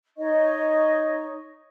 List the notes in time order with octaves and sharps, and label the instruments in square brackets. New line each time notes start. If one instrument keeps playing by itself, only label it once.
[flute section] D#4 C#5 D#5 C#6